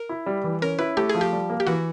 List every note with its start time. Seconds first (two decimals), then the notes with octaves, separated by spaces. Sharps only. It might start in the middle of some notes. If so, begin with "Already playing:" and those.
Already playing: A#4
0.09 E4
0.26 G3
0.44 E3
0.62 C#4 A#4
0.79 E4 B4
0.97 A3 G4
1.09 G#4
1.15 F3
1.21 G4
1.33 G3
1.50 A#3
1.60 G4
1.67 E3 F#4